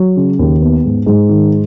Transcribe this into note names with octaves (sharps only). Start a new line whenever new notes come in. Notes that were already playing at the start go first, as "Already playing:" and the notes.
Already playing: F#3
C#3
D#2
B3
G#2
G#2
D#3